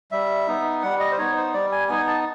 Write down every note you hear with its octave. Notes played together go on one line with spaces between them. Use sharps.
G3 E5
B3 D#4
G3 F#5
D#5
C5
B3 D#4 C#5
C5
G3 D5
G#5
B3 D#4 G#5
A5